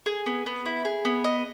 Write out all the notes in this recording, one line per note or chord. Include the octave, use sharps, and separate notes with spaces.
G#4
B3
B3
E4
G#4
B3
D#5